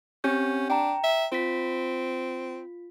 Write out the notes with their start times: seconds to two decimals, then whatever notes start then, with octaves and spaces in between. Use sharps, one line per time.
0.24 C4 C#4 G4 G6
0.70 D4 G5 A#5
1.04 E5
1.32 C4 F4 B6